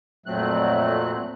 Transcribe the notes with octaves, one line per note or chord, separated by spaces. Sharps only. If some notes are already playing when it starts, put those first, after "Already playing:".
F2 A#2 F#3 A3 C4 F#6